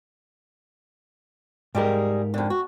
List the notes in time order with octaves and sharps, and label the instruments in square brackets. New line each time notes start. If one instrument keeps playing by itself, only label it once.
[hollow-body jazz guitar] G#2 G4 A#4 [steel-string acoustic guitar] G3 G#3 G#4
[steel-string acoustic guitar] F2 D3
F#4